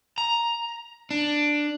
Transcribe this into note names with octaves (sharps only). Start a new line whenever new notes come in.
A#5
D4